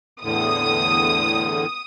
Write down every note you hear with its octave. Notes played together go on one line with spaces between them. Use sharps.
E2 A2 D3 D#6